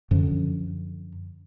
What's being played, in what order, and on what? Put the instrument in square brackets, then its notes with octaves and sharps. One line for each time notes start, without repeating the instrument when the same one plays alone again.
[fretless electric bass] F#2 D3 F3